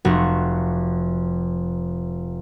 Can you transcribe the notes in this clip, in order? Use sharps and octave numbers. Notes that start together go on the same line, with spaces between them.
F1 F#4